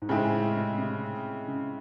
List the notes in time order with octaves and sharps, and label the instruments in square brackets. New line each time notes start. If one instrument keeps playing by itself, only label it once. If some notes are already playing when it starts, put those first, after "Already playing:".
[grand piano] G#2
[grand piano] A2 [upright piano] C#3 G#3 C4 E4 G#4
[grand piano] C3
C3
C#3